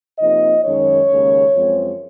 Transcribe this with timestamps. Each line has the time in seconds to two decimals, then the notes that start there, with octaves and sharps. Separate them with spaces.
0.19 C3 F3 A#3 D#4 D#5
0.65 F#2 D#3 G#3 C#4 C#5
1.10 D#2 C#3 G#3 C#4
1.55 F#2 F3 G#3 C4